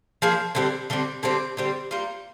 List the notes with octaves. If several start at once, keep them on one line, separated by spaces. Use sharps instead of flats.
F3 A#3 D4 G#4
D3 G3 C4 G4
D3 G3 C4 G4
D3 G3 C4 G4
D3 G3 C4 G4
G3 A#3 F4